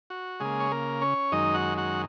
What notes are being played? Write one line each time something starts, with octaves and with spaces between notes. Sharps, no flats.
F#4
C#3 G#3 A#3 G#4
C#5
A#3 A#4
C#4 C#5
F#2 D#3 G#3 D#4 D#5
F#4 F#5
F#4 F#5